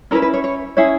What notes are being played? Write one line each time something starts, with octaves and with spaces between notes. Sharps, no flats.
C#4 E4 A#4 B4 A#5
B4
C#5
C#5
C#4 E4 G#4 C#5